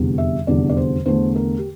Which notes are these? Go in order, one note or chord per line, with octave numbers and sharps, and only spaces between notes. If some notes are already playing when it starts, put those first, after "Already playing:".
Already playing: F1 E2 D3 G3
E5
F1 E2 D3 G3 D5
D5
C5
E2 D3 A3 C5
A#4
G4